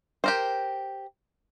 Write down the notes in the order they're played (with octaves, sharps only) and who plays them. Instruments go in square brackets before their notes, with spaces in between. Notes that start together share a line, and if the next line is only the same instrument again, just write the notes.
[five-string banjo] G4 A#4 C5